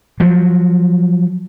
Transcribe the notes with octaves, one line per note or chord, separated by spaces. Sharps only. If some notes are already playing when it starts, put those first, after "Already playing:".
F3 F#3